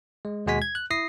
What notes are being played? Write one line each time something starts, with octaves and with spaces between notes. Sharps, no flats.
G#3
D#2 B2 G#3 F#4 G#5 B6
G#6
F#6
E4 D#6 A#6 C7